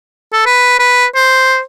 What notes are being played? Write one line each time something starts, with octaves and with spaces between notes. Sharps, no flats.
A4
B4
B4
C5